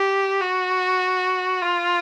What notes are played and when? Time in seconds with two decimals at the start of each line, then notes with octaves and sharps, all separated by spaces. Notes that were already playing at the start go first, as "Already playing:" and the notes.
Already playing: G4
0.41 F#4
1.62 F4